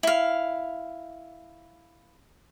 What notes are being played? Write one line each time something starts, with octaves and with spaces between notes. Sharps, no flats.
E4 F5